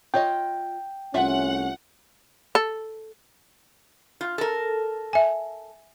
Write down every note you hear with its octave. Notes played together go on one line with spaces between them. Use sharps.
F4 C#5 D#5 G5
C2 A3 C#4 F4 E5 F#5
A4
F4
A4 A#4
E5 G#5